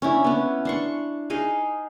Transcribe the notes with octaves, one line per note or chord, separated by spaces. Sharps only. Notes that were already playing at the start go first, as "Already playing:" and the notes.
C#4 D4 E4
B3 C#4
D4 C6 C#6
D#4 G#4 D#5 F5